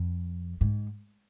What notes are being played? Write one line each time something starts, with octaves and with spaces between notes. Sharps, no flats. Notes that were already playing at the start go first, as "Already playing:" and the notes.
Already playing: F2
G#2